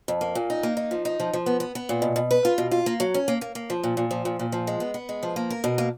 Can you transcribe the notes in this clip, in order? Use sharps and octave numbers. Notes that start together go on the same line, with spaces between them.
F2
A#3
A#2
D#4
A#3
D#4
F3
D#4
F3
F3
B3
B3
B3
A#2
B2
B2
B4
F4
B2
F4
A#3
F#3
C#4
A#3
A#3
A#3
F3
A#2
A#2
F3
A#2
A#2
F3
G#3
B3
B3
G#3
F3
A#3
A#4
B2
A#3